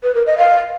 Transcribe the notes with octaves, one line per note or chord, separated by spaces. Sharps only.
B4
A#4
D#5
F5